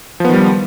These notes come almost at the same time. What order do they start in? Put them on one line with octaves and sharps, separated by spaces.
F3 B3 D#3 G3